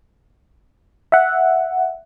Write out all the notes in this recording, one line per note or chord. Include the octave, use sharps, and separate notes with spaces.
E5 F#5